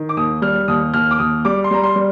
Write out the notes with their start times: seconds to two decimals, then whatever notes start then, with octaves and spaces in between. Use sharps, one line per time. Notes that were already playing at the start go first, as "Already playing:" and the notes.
Already playing: D#3
0.09 D6
0.17 D#2 D#6
0.42 G3 F6
0.68 D#2 D#6
0.94 D#2 F6
1.11 D6
1.19 D#2 D#6
1.45 G3 D6
1.64 C6
1.71 G3 A#5
1.84 C6
1.95 G3